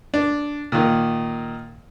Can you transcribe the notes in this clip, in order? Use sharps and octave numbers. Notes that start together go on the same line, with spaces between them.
D4
A#2 D#3